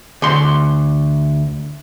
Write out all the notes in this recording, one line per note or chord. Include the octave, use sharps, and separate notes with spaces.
D2 C6